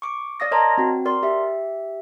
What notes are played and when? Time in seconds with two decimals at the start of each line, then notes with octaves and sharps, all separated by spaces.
0.02 C#6 D6
0.40 D5 F5 D#6 A#6
0.51 A#4 C#5 D#5 A5 A#5 C6
0.78 C4 F#4
1.05 A#4 D5 C6
1.23 G4 E5